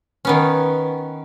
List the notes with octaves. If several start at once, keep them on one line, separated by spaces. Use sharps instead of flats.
D#3 B3 C#4